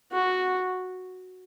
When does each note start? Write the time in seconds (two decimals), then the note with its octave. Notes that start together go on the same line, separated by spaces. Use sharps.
0.12 F#4